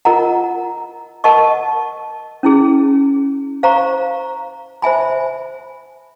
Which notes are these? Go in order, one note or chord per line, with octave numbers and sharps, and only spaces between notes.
F4 A#4 D#5 F#5 A#5
A#4 D#5 F#5 A5 C#6
C#4 E4 G#4
C5 F5 A#5 C#6
C5 E5 G#5 B5